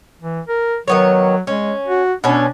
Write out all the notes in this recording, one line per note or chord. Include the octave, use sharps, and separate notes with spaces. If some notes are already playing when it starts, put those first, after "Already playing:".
E3
A#4
D#3 F#3 B3 C#5
G#3 C#4
F#4
B2 C#4 D4